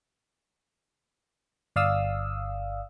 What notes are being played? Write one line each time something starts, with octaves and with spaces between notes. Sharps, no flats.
G1 D5 F5 D#6 E6